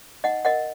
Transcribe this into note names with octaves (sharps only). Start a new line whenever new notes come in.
D#4 D#5 F#5
A#4 D#5 F#5